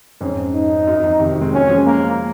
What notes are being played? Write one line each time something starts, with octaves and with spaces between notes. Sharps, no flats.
F2 G#2 C#4
D#4
F#2
F2
C3 D#3
D#3 F#3
G#3 C4
F#3 A#3 C#4
F3 G#3
A#3